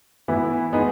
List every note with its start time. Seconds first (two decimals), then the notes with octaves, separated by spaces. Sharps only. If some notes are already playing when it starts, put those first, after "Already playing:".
0.28 E3 B3 E4
0.73 G#3 B3 D#4 G#4